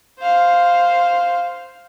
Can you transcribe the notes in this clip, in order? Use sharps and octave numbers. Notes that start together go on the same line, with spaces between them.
C5 F5